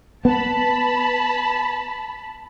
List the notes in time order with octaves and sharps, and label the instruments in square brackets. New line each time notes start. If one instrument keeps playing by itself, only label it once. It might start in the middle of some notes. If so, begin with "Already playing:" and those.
[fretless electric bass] B3 [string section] A5 B5